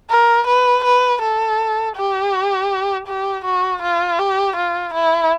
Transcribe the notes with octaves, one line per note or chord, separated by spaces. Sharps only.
A#4
B4
B4
A4
G4
G4
F#4
F4
G4
F4
E4